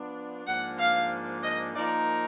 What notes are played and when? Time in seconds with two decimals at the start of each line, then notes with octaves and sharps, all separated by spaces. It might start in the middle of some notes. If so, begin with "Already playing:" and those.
Already playing: F3 B3 D4
0.47 G#2 F3 A#3 D4 F#5
0.79 F5
1.43 D#5
1.75 F3 A#3 D#4 A#4 D5